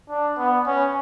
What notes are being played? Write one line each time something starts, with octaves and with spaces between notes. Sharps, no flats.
D4
B3
C#4